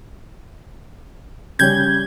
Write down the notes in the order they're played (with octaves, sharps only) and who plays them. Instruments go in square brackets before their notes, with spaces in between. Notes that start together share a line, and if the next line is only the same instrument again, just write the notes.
[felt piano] C#3 G3 C#4 [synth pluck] G6 G#6